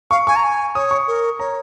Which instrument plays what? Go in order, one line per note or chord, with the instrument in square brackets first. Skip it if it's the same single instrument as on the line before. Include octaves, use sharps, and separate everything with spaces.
[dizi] F5 [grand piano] C#6
[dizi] G#5 [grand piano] C#6
[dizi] A#5
G#5
[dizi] C#5 [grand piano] D#6
[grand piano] C#6
[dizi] A#4
[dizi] C#5 [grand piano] A#5